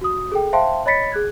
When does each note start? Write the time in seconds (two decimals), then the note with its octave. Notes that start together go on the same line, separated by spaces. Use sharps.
0.01 F#4 D#6
0.32 G#4 A4 G5
0.53 C5 E5 F5 G5 A5 C6
0.85 C#5 D#5 B5 A6 B6 C#7
1.12 G#4 F#6 G#6